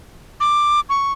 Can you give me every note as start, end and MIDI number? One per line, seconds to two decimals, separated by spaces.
0.40 0.80 86
0.89 1.12 85